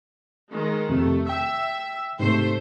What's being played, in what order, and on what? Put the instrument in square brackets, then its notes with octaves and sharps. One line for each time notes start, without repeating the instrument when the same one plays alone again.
[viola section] D#3 G#3
[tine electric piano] F2 C3 [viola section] A3
[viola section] E5 [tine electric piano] G5 E6
[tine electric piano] G#2 C3 [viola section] A3 C5